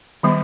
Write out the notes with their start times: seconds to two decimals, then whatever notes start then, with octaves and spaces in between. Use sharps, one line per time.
0.23 D#3 G3 B3